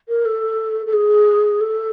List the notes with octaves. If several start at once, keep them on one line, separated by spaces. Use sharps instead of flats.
A#4
A4
A4
G#4
A4